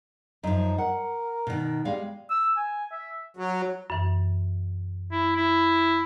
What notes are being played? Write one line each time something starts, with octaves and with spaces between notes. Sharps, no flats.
F#2 F3 D#4
A#4 F#5
B2 D#3
G3 G#3 F5
E6
G#5
E5
F#3
F#2 E3
E4
E4